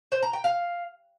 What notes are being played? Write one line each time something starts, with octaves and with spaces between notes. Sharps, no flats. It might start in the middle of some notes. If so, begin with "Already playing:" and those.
C5
A#5
G5
F5